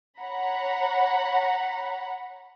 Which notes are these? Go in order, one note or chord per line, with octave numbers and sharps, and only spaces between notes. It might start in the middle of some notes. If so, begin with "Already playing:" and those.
C#5 F#5 A#5 B5